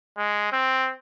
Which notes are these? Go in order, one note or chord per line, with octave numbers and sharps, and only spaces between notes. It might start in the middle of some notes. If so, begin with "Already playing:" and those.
G#3
C4